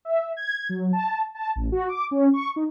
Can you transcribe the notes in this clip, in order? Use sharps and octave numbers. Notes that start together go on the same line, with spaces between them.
E5
G#6
F#3
A5
A5
A1
F#4
D6
C#4
C#6
D#4